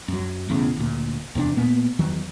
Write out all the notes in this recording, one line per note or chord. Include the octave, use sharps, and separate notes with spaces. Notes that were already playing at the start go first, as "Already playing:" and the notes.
F#2 F#3
E1 E2 A2 C#3
D2 A#2
E2 C3 A#3 D4
A#2 A#3 B3
E2 D#3 F#3